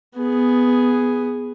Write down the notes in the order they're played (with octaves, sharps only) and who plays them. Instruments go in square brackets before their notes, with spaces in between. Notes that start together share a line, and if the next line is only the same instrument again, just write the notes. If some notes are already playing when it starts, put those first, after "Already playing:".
[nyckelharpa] B3 G#4